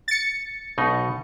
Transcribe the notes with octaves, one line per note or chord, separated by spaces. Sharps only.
A6 C#7
B1 B2 D#4